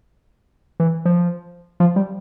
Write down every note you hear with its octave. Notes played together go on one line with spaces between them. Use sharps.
E3
F3
F3
G3